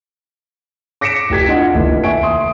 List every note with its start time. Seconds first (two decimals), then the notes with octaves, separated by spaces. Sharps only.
1.01 D6 A#6 B6 C#7 D7 E7
1.30 F1 G4 G#6 B6
1.48 D4 F4 D#5 F#5
1.72 F1 D#2 E4 A4
2.04 E5 G#5 C#6 D7
2.23 C6 D#6